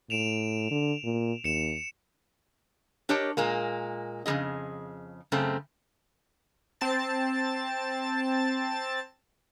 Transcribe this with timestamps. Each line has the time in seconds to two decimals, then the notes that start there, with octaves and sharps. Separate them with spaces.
0.10 A2 D7 E7 F7
0.71 D3
1.04 A#2
1.44 D#2 C#7 E7
3.09 D4 G4 A#4 C#5 D#5 A5
3.37 A#2 G#3 A#3
4.26 F2 C#3 G3 G#4 D#5
5.32 F#2 C#3 A3 C4
6.81 C4 A5 A6